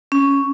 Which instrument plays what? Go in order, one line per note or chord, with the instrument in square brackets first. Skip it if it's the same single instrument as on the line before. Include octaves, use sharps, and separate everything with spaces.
[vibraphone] C#4